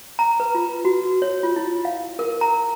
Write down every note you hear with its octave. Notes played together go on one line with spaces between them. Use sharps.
A#5
B4
F4
F#4
C#5
F4
E4
F5
A#4
A#5